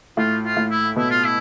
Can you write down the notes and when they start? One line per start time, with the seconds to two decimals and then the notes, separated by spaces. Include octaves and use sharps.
0.17 A2 F4
0.44 F4
0.57 A2
0.70 E4
0.96 B2 E4
1.10 F4
1.25 E4